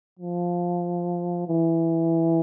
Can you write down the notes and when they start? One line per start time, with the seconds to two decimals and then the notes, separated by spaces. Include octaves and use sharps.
0.19 F3
1.48 E3